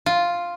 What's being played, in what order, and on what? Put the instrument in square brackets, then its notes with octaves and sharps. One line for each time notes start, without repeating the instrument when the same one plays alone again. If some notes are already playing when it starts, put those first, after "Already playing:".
[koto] F4